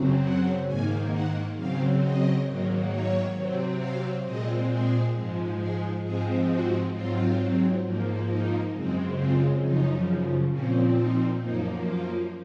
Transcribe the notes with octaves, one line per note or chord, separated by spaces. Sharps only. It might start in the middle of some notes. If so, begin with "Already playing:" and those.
Already playing: F#2 C#3 F#3 C4
F#5
G#2 D#3 A#3 G#5
F#5
C#3 F#3 C4 F5
D#5
G#2 D#3 F#3 A#3
C#5
C3 F#3 C4
F5
A#2 G#3 C4 D#5
G#4
G#2 F3 G#3
G#4
G#2 F3 G#3 C4 G#4
F#4
G#2 F#3 C4 F4
G#2 F3 A#3
D#4
F#2 C#3 G#3 C4
F4
F#2 C#3 F3 D#4
A#2 F3 C4 C#4
D#4
F#2 F3 A#3 D#4
F4